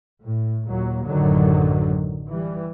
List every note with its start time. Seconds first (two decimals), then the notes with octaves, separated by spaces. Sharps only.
0.22 A2
0.67 D#2 A#2 F#3
1.05 A1 F#2 D3 D#3 F#3
2.29 E3 G3